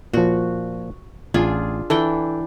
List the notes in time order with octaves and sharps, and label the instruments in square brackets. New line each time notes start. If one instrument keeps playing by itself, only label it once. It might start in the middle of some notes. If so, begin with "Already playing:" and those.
[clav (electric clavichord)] A#2 F3 [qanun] F#4
[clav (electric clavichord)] A1 [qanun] D4 F4 G#4
[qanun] E3 D4 G5 [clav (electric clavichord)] A4